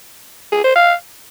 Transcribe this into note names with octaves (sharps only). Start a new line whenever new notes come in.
G#4
C5
F5